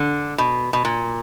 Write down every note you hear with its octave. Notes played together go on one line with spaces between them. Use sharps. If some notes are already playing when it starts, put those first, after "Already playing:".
Already playing: D3
B2
B2
A#2